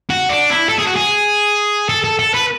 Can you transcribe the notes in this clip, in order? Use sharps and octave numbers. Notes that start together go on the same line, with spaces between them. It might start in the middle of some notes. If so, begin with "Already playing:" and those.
F#4
D4
E4
A4
G#4
F#4
G#4
A4
A4
A4
B4